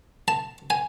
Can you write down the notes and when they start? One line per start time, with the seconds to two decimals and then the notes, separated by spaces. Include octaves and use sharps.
0.28 A5
0.70 G#5